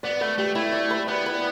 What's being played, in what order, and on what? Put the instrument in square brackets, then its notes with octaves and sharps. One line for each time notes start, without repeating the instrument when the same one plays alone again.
[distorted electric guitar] B3 [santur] D5
[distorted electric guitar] A3 [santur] B4
[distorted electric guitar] A3 [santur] G4
[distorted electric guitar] A3 [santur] E4
[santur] D5
B4
[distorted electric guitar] B3 [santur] D5
[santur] B4